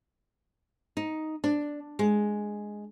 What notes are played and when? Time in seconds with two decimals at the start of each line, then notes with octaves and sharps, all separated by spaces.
0.97 D#4
1.44 D4
1.99 G#3